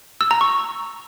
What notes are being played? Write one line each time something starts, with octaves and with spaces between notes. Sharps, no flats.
E6
A#5
C#6